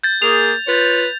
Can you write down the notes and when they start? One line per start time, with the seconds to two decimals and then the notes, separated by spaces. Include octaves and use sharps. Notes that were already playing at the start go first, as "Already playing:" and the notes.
0.03 G6 A6
0.22 A#3 G#4 F7
0.67 F4 B4 C#5